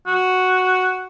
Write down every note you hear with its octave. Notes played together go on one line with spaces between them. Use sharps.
F#4